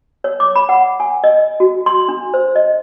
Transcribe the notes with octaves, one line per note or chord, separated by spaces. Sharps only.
C#5
D6
B5
F#5
G#5
D#5
F#4
C6
D4
C5
D#5